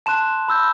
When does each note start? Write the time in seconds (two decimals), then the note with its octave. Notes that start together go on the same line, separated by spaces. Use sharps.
0.06 A5 C6 F#6 E7
0.48 B5 E6 G6